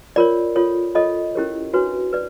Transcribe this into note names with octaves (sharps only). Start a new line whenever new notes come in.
F4 A#4 C#5 D5
F4 A4 C#5
F4 A4 C#5 D#5
C#4 E4 G4 A#4 C#5
D4 F#4 B4 C#5
B4 D5